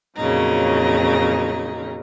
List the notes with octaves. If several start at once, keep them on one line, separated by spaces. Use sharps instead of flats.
F2 A#2 C#3 F#3 D#4